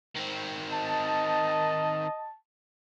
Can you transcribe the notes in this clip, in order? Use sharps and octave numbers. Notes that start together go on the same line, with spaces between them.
D#3 C4
D#5 A5